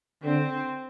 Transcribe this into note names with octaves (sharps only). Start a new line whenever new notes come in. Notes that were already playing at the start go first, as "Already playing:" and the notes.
D3 C4